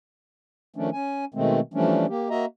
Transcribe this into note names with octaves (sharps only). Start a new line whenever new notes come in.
D#3 F3 A3 C#4 D4
C#4 G#5
B2 D#3 G#3 A3 C4
E3 F3 G3 A3 C#4 D4
A#3 G4
A#3 F#4 D#5 E5 A#5